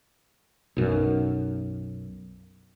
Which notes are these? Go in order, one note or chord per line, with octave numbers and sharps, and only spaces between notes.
B1 F#2